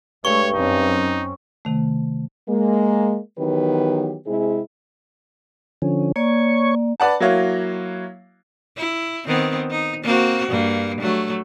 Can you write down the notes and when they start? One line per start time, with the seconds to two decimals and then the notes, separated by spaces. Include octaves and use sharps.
0.25 G2 G#3 A3 C#5 C#6
0.55 F#2 C4 C#4 D#4
1.65 C3 D#3 A3
2.49 G#3 A#3
3.38 D#3 E3 F#3 B3 G4 B4
4.26 C3 G#3 C4 E4 G#4
5.82 D3 F3 C#4
6.16 A#3 C#5 D5 C#6
7.00 B4 D5 F#5 A5
7.20 F#3 A#3 E4 F#4 C#5 F5
8.77 E4
9.27 D#3 B3 C4
9.71 D#4
10.03 A#3 C4 F#4
10.48 G2 A#3
11.01 F#3 A3